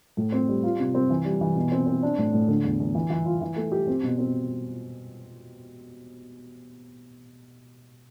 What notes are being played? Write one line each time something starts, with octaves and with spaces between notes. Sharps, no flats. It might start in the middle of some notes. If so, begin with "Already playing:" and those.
A2
C4
G3
F4
C3
C4
E3
G3
E3
B2
C4
C4
D4
A2
A2
D3
E2
E2
E3
E3
F4
E3
A3
G4
C4
B2
C4